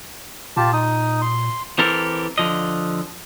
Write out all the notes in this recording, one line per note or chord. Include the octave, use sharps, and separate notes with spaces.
A#2 F4 G4 A5
D#4 D#6
C6
E3 C4 G4 A4 A#4
D3 F3 D#5